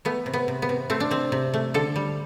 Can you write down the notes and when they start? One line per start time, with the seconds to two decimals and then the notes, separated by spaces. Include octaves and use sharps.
0.05 A3 B3
0.26 C3
0.33 B3
0.48 C3
0.62 B3
0.69 C3
0.90 A3 C4
1.00 D4
1.11 C3 C4
1.32 C3
1.54 A3
1.74 D3 A4
1.96 G3